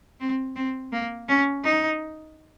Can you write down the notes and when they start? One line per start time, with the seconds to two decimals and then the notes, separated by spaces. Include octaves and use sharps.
0.20 C4
0.56 C4
0.92 A#3
1.28 C#4
1.64 D#4